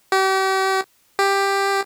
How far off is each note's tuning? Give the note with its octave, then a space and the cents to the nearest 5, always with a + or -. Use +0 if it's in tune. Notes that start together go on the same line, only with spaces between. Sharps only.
G4 -40
G4 +10